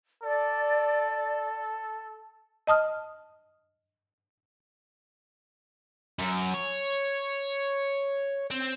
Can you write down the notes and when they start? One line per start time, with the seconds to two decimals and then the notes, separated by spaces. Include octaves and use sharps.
0.23 A4 D5
2.67 D#5 A5 D#6 F6
6.19 F#2
6.54 C#5
8.51 C4